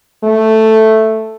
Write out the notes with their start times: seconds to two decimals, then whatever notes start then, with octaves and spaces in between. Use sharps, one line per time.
0.24 A3